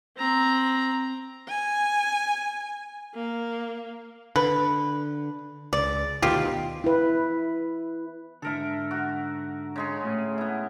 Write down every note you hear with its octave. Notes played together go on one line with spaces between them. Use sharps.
C4 A#5
G#5
A#3
D3 B4
C#2 D5
D2 B2 D#3 F4 G4
E4 B4
G#2 D3 A4 A#4 E5
F#4 A#4
C#3 G#3 G#4
A2 C#4
B3 E4